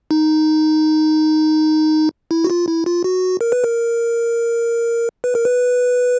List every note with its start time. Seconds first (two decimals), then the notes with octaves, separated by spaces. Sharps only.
0.11 D#4
2.31 E4
2.44 F#4
2.50 F4
2.68 E4
2.86 F4
3.04 F#4
3.41 A#4
3.52 B4
3.64 A#4
5.24 B4
5.35 A#4
5.45 B4